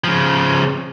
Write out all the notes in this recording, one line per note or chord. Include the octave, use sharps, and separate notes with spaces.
C#3 F3